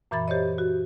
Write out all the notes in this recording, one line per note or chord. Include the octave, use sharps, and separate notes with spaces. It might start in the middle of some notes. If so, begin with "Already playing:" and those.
F#2 A#2 E3 E5 B5 A6
G4 C5 C#5 D#5
F#4